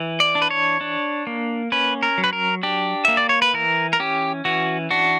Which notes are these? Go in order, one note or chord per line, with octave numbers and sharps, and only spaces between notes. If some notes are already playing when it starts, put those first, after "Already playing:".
Already playing: E3
D5
D4
B4
C#5
D4
A#3
C#4 B4
A#4
F#3
B4
A#4
D4 G4
A#3 E5
D5
C#5
B4
E3 A#4
A#4
C#4 G4
E3 F#4
D4 F#4